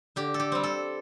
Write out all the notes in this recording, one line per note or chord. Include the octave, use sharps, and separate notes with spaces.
D3 G4
A4
G4
G3 C4
A4